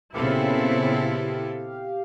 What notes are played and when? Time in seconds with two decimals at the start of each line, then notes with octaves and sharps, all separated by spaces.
0.14 A#2 C#3 B3 C4 E4 G4 A4 F5